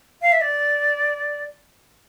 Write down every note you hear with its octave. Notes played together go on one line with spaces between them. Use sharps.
F5
E5
D5